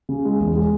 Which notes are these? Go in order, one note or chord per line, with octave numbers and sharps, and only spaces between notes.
C#3
G#3
E2
G#3